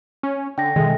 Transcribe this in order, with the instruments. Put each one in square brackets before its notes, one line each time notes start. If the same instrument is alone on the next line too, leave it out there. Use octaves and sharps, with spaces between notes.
[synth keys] C#4
[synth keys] D3 [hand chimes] G5 A#6
[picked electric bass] B2 D#3 [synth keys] G#3 [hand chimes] A4 E5